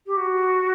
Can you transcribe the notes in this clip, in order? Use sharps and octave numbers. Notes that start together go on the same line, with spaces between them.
G4
F#4